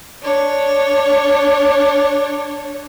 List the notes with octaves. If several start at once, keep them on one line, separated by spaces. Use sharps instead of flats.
D4 C#5